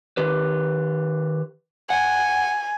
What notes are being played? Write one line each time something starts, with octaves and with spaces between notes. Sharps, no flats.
D#3 G4 B4
F#5 G#5